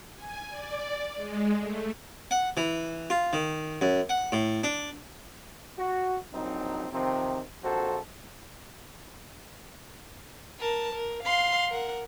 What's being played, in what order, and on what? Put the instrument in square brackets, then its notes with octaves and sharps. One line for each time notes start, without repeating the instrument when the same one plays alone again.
[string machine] G#5
D5
G#3
A3
[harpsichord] F#5
E3
F4
D#3
F#2
F#5
A2
D4
[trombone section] F#4
A#1 F#3 C4 D#4
C3 D#3 F3 C4
A#1 F2 F#4 A4 C5
[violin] A#4 A5
A#4
F5 C6
A#4 F#5